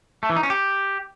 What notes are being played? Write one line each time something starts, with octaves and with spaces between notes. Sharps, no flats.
A3
E3
D#4
C#4
G4